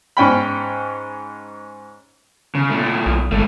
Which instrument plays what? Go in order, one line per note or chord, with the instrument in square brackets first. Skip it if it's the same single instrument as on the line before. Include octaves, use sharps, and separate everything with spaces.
[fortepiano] G#2 C#4 G5 B5
[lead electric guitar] C#3
A#2 A3
[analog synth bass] B1
[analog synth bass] G#1 [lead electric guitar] G#2 A3